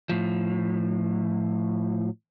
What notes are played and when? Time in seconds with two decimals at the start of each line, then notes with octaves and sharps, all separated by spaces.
0.09 A2 F3